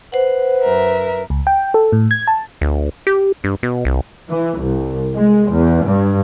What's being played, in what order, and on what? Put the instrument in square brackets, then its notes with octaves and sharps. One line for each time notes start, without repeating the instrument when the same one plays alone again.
[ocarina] B4 [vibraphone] C5 F#5
[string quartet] F#2 A#4 E5
[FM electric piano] C#2
G5
A4
A2
G#6
A5
[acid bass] D2
G4
G2
B2
C2
[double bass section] E3
C2
G#3
E2
G2